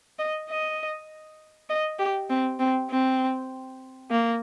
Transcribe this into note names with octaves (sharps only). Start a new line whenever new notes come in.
D#5
D#5
D#5
G4
C4
C4
C4
A#3